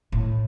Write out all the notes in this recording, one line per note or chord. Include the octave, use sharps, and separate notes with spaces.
A2